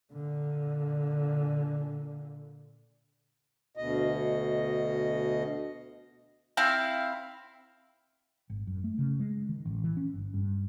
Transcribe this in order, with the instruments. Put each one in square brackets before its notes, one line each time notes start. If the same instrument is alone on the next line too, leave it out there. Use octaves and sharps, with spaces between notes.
[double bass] A#2 D3
[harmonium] D2 B2 D#5
[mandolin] C4 E4 F5
[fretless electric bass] G#1
F#2
A3
C#3
G#3
D#3
A1
E3
C#4
G1
G2